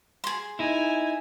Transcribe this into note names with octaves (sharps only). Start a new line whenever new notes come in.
G#4 C6
D#4 E4 G#5